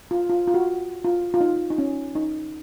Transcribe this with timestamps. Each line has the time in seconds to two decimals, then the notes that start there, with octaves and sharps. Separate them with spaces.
0.11 F4
0.30 F4
0.48 F4
0.54 F#4
1.04 F4
1.34 F4
1.41 D#4
1.70 D#4
1.78 C#4
2.15 D#4